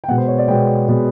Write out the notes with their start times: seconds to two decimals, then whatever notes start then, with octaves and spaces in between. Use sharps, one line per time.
0.04 G5
0.08 B2 G#3 B3 F#5
0.18 C5
0.28 C#5
0.38 D5
0.48 B2 G#3 B3 G5
0.88 B2 G#3 B3